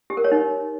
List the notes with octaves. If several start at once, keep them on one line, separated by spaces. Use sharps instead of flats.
G4
A#4
C#5
D#4